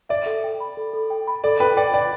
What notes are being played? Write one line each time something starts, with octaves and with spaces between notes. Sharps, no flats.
D5 E5
A4
G5
B5
A4
A4
G5
B5
A4 D5
B4 G5
D5 G5
D5 G5